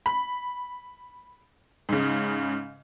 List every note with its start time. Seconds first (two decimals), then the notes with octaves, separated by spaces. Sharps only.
0.06 B5
1.89 G#2 C#3